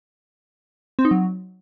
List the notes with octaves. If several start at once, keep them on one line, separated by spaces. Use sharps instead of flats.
C4
D#4
F#3